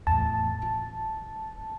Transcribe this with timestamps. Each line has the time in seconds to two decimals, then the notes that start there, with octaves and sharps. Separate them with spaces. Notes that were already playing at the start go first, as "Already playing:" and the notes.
0.07 E2 A2 A5
0.62 F4